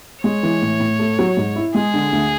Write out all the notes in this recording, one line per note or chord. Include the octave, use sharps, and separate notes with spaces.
G#3 C#5
E3
A2
A2
A3
F#3
G#2
E4
G#3 G#4
D3
D2